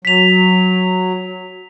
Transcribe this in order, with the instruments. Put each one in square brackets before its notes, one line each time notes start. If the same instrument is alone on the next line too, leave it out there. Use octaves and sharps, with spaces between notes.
[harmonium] F#3 [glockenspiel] B6 F7